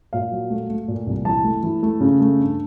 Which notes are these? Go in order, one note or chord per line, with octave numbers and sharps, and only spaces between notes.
A#2 F5
F#3
A3
A3
A#2
C2
E3 A5
A3
E3
A3
C#3
A3
G2